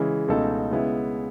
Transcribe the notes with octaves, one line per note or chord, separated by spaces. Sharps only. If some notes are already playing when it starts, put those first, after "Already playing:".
Already playing: C#3 E3 G#3
C#2 B2 A3 D#4 A4
C#3 G#3 B3 E4